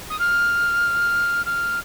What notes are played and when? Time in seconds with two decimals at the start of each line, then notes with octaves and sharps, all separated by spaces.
0.10 D#6
0.19 F6
1.45 F6